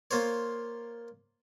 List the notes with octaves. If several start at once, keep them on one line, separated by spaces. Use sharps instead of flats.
A#3 F4 C5 C#5